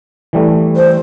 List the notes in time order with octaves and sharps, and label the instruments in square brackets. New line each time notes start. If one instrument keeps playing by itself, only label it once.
[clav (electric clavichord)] E3 G3 A3
[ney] C5